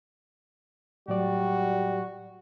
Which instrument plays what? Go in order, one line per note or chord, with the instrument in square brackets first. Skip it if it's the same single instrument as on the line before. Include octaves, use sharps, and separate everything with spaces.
[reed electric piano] A2 F#3 D5 [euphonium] G3 [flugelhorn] F#4